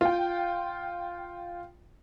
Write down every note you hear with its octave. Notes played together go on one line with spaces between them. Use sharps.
F4 G5